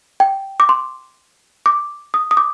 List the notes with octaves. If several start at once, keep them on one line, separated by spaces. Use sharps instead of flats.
G5
D6
C6
D6
D#6
D#6
D6